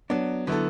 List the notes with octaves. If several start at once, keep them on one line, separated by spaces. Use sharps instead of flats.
F#3 B3 D4
D3 F#3 B3 E4 A4